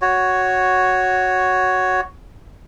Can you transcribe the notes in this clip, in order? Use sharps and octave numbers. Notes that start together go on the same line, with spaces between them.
F#4 C#5